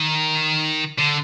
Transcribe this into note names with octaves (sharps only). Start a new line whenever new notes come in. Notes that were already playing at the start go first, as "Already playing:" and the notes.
Already playing: D#3
D3